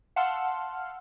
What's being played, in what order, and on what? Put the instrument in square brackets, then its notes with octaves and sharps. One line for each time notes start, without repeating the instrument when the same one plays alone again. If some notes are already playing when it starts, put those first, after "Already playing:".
[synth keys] F5 F#5 A5 C6 E6 F6